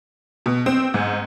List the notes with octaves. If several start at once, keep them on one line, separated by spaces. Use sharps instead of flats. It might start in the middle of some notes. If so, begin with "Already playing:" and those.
B2
C4
G#2